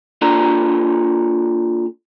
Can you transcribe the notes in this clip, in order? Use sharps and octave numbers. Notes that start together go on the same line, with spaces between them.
A#3 D4 F4 A4 D5 A#5